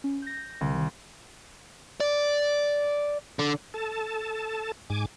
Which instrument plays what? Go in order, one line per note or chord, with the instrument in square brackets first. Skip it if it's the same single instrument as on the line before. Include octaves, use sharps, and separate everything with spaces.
[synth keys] C#4
G6 A#6
[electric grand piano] C2 [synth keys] D3
[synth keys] D#3
[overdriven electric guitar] D5
D3
[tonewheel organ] A4 A5
G#2 G#5 D6